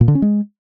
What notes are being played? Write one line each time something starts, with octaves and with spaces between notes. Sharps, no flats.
A#2
D3
C#4
G#3